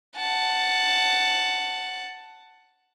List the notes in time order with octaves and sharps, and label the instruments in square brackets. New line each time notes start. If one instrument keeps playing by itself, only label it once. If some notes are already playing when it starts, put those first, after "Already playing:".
[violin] F#5 A5